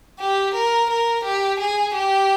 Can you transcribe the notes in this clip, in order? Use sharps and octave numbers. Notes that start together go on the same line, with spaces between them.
G4
A#4
A#4
G4
G#4
G4